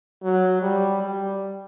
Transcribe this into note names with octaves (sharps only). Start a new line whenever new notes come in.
F#3
G3
G3